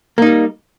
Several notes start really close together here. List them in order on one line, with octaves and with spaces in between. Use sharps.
A#3 D#4 G3